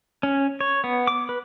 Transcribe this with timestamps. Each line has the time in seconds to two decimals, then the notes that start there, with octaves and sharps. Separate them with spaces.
0.23 C#4
0.61 C#5
0.84 B3
1.07 D6
1.29 B4